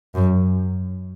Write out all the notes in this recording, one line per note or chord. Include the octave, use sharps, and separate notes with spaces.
F#2